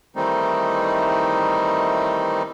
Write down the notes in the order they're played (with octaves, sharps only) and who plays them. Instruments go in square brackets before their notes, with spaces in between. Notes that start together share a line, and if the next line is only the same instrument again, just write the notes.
[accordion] D#3 E3 G3 A3 C4 D#4